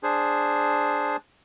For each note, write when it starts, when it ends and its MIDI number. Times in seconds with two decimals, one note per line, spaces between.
0.03 1.16 62
0.03 1.16 68
0.03 1.16 72